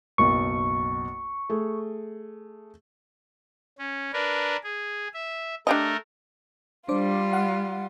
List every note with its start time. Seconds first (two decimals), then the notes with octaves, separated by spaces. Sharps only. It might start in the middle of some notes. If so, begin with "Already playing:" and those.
0.18 F#1 B1 G5 C#6
1.50 A3 G#4
3.79 C#4
4.14 D4 A#4 B4
4.64 G#4
5.14 E5
5.67 A3 D4 G4 A#4 D#5
6.89 G3 D4 F4 C5 D6
7.33 F5 F#5